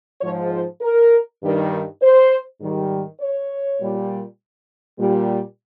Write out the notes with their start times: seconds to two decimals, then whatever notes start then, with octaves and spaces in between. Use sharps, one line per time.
0.21 G#2 F3 C#5
0.52 C5
0.80 A#4
1.41 G2 D#3 G3
2.00 C5
2.60 G#2 D#3 G3
3.19 C#5
3.79 A#2 G3
4.98 A#2 G3